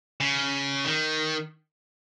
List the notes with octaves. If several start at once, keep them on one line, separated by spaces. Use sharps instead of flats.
C#3
D#3